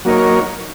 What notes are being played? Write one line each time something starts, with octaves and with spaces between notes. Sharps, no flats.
F#3 A#3 D#4 A#4 C#5